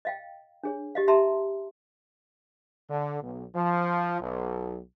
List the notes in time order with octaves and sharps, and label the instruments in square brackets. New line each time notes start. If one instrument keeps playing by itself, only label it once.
[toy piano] D#5 F5 G5
D4 G#4 C#5
G4 D#5 F5
G4 E5 A5 A#5 C6
[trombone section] D3
B1
F3
B1